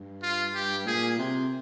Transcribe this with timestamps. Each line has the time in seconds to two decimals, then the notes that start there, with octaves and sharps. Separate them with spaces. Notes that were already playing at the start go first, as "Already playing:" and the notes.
Already playing: G2
0.23 F4
0.55 G4
0.87 A#2 G#4
1.19 C3